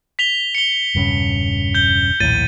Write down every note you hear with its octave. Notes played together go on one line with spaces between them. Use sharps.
B6 F7 G7
C#7 G7
E1 G2 C#3
G6 G7
A#1 D#2 A2 A6 D#7